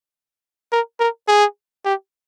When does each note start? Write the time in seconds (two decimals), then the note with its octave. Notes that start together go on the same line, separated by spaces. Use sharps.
0.72 A#4
1.00 A#4
1.28 G#4
1.85 G4